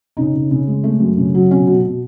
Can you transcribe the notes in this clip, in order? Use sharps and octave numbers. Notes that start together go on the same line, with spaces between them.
C#3 D#4
C#3
C#3
G#3
A3
F#2
C#3
F#3
B2 C#4
B2
B2